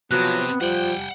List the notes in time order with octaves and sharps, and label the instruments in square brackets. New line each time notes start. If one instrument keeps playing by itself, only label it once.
[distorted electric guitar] C3 [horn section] F3 F#3 [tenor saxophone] B3 [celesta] F#6
[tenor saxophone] F3 [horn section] G3 [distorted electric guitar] F#5 G5